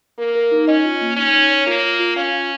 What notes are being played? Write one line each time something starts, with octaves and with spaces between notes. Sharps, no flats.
A#3 A#4
A#4
D#4
C#4 D#5
F4
A#3
C#4 D#4
C#5
C#5
A#3 F4
F4
F4
C#4 F5
F4